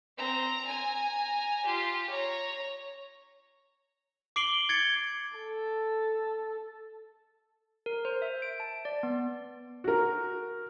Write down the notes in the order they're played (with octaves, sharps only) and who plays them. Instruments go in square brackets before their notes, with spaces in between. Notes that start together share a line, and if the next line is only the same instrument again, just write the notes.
[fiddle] C4 A#5
G#5 A#5
F4 G4
C#5 A#5
[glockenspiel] D6 C7 D7 F#7 G7
G#6 A6 C#7 G7
[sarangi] A4
[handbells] A#4
C5
E5
D7
A5
D5
B3
[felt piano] F#4 A#4